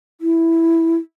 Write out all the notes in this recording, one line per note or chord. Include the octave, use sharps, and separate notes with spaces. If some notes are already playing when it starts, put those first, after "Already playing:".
E4